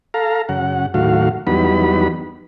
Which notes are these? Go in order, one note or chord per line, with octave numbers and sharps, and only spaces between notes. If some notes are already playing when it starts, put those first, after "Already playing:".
A4 F5 A#5
F#2 C#3 F#5
D#2 A2 F#3 F#4 F5
E2 F#3 G3 B3 D#4 B5